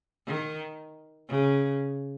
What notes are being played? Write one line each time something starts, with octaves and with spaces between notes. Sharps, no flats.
D#3
C#3